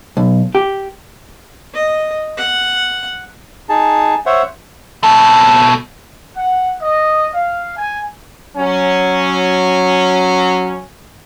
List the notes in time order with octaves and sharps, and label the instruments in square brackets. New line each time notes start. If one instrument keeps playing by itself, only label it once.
[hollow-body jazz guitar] B1
G4
[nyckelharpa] D#5
F#5
[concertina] D#4 G#4 A5
C5 C#5 E5 F#5
[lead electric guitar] B2 A4
[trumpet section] F#5
D#5
F5
G#5
[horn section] F#3 C#4